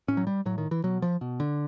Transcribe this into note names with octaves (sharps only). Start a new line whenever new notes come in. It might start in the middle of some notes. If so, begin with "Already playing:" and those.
A2 C#4
F#3
G3
A2 F#3
D#3
E3
B2 F#3
F3
B2
D3